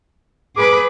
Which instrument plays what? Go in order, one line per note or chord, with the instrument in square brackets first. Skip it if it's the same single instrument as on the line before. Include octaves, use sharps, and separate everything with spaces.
[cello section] G#4 B4 [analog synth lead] D6